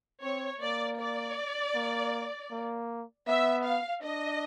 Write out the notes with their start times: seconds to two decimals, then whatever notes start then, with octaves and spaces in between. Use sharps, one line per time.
0.22 C4 C#5
0.60 A#3 D5
0.99 D5
1.74 A#3
2.51 A#3
3.27 B3 E5
3.65 F5
4.03 D4 D#5